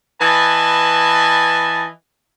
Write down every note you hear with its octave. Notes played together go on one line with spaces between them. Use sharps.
E3 B4 D#5 G#5 A5